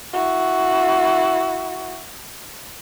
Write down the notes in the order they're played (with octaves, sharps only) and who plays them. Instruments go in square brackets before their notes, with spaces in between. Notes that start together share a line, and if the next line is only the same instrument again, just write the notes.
[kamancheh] E4 F#4